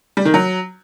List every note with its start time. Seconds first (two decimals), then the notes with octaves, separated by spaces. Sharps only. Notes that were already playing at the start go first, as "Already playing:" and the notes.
0.17 G3
0.25 D#3
0.34 F#3